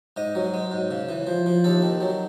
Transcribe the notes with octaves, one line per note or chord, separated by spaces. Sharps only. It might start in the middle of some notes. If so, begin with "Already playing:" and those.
G#2 D#5
F#3
G#3
G#2
C#3
E3
F3
F3
D#2 A4
D#3
F#3